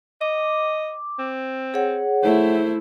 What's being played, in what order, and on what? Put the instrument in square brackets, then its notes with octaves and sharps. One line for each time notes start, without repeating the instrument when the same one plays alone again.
[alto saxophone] D#5 [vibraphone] D6
[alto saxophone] C4
[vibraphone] G#4 C#5 F#5
[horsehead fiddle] A3 E4 [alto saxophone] C5